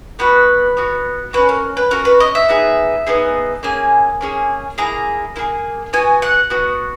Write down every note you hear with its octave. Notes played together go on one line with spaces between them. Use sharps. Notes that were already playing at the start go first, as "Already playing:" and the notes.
B3 F#4 B4
B3 F#4
C#4 F#4 B4
A#4
B4
C#4 F#4 A#4
B4
D#5
E5
B3 D#4 G#4
B3 D#4 G#4
A#3 C#4 G#4 G#5
A#3 C#4 G#4
A#3 E4 G#4 A#5
A#3 E4 G#4
B3 F#4 G#5
F#5
B3 F#4